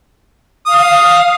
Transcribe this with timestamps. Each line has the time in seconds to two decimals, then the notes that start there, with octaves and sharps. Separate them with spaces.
0.66 F5 D#6